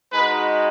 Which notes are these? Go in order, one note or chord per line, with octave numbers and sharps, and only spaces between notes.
G#3 D#4 F#4 B4